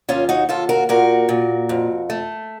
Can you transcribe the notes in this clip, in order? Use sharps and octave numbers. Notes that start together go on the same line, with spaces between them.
D#2 C#4 F4
D#4 F#4
D#2 F4 A4
F#4 A#4
A#2 F#4 A#4
A#2
F2
A3